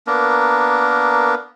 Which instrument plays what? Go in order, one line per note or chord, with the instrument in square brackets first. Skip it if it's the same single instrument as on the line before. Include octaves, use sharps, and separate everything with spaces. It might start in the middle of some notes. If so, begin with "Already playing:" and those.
[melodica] A#3 B3 D4 A#4